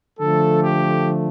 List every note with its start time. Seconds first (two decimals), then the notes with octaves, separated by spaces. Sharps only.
0.19 D3 F3 A3 A4
0.63 G4